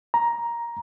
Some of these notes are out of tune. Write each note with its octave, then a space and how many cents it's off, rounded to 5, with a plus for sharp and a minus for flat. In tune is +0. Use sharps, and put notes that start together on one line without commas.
A#5 +10